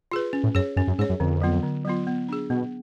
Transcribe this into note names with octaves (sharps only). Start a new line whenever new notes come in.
F4 G#4 B4
C#4
A2
F#2 G#4 C#5
F#2 C#4
F#2
G#2 G#4 C#5
F#2
F2 D3
F#3 B3 F4
D3
F#3 B3 F4
B3
D4 G#4
B2 B3